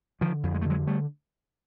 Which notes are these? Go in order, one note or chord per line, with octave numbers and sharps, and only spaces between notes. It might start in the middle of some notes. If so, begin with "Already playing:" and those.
D3 D#3 F3
F2
G#3
A3
D3 F#3 G#3
G3 A3